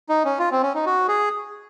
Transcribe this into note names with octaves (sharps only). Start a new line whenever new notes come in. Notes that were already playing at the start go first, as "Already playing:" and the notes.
D#4
C#4
F4
C4
C#4
D#4
F#4
G#4